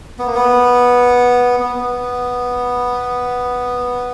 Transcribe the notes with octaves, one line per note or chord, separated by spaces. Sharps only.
B3
A#3
B3
B3